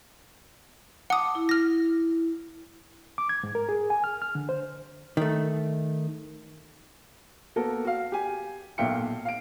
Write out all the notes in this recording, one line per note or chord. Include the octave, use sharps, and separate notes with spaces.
F#5 A5 D6 D#6
E4
F6 A#6
D6
G#6
G#2
A#4
G#4
G#5
F6
F6
D3
C5
D#3 A3
A#3 B3 F#4 A4 A#4
F#4 F5
G4 G#5
B1 A#2 E5 F5 G5 C#7
F5 D7